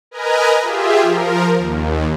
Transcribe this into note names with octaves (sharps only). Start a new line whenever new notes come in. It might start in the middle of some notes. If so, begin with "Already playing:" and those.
A#4 B4 D#5 G#5 A#5
F4 G4 G#4 E5
F3 A#4
D#2